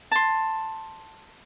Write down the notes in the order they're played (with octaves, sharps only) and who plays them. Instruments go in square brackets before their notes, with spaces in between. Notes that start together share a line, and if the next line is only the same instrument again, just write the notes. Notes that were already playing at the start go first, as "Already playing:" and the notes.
[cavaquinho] A5 C6